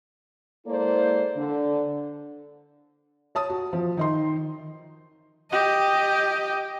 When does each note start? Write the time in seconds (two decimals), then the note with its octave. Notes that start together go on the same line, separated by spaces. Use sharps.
0.67 G#3 A#3 E4 A4 C5 D5
1.37 D3
3.35 C#5 A5 D#6
3.50 F#4
3.73 F3
3.97 D#3 D#4 C6
5.51 G4 D#5